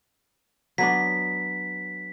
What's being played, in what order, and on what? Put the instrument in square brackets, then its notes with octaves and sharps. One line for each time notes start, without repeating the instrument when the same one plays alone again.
[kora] F#3 B3 D4 [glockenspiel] B6